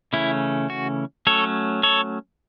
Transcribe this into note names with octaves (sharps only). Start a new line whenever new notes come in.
C#3 E3 A3 C#4 E4
F#4
F#3 A3 C#4 A4 C#5
A4 C#5